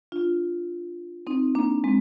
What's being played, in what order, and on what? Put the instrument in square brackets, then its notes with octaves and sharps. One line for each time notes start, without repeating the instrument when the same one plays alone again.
[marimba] D4 F4
C4 D#4
A#3 D4
G#3 C4